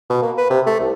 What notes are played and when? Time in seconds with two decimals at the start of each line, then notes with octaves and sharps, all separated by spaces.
0.10 B2
0.22 A#3
0.37 B4
0.50 C3
0.66 A3
0.80 C2